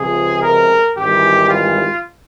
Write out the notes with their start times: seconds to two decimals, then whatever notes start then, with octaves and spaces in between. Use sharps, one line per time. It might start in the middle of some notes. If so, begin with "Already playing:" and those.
Already playing: C#2 C3 F3 G#3 G#4
0.42 A#4
0.97 G#1 G#2 E3 G3 G4
1.50 F4